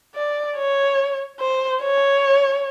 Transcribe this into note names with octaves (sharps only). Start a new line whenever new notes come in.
D5
C#5
C5
C#5